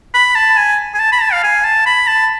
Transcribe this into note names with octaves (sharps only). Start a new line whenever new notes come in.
B5
A5
G#5
G#5
A5
B5
A5
F5
G#5
A5
B5
A5